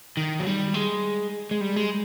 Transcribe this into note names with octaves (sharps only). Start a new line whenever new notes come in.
D#3
F#3
G3
G#3
G#3
G3
G#3